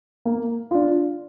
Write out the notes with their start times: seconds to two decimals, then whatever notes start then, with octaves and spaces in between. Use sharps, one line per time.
0.25 A#3
0.71 D4 F4